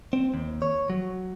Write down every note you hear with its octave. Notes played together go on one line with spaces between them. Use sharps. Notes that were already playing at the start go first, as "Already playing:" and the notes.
C4
D#2
C#5
F#3